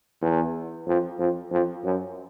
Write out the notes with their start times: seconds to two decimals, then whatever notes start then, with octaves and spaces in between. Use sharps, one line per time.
0.21 E2
0.87 F2
1.19 F2
1.51 F2
1.84 F#2